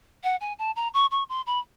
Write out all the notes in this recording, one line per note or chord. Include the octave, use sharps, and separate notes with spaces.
F#5
G#5
A5
A#5
C#6
C#6
C6
B5